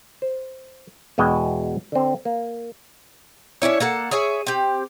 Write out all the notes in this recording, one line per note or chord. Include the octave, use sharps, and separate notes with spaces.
C5
E2 B2 G#3 F#4 E5 G5
D3 C4
A#3
C#4 D4 E4 C#5
A#3 A4 F#5
G#4 C#5 E5 G#5
C4 G4